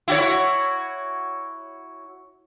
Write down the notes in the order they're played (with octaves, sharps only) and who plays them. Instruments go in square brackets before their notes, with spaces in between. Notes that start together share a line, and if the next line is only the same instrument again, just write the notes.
[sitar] E4 F#4 C#5